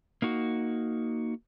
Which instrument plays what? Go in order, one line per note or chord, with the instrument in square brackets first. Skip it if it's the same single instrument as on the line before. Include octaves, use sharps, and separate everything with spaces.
[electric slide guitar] A#3 D#4 F#4